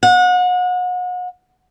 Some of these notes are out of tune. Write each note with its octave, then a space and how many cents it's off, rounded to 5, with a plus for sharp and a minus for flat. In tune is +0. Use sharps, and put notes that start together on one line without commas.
F#5 -35